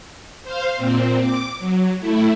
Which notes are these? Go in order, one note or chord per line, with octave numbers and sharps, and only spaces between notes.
C5 F5
A#2 C4
D6
F#3
A3 E4